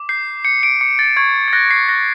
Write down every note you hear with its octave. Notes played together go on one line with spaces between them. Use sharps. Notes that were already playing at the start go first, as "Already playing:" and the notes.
Already playing: D6
G6 C7
G6 C#7
D7
D6 C#7
A6
C#6 G#6
A6
F#6 A#6
C7
F#6 A#6